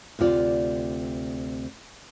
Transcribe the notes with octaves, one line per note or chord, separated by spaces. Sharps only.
D2 C3 F4 D5